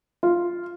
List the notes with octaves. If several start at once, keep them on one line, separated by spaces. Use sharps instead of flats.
F4